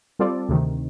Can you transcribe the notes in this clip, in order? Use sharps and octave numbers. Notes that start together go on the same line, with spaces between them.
G3 C4 F4 A4 D5
D2 C3 D#3